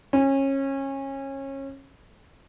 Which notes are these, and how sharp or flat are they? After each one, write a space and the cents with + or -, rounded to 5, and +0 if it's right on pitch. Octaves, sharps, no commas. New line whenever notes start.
C#4 -25